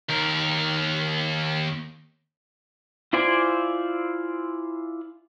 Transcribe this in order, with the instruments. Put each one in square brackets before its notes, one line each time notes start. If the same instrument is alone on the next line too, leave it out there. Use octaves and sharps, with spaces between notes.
[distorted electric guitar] D#2 A#4
[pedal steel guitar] E4 F4 C5 D5 G#5